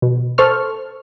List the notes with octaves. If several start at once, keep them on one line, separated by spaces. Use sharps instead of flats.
B2
A4 C5 C#6 F6